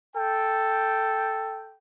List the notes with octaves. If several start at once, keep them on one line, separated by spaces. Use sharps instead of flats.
A4 G5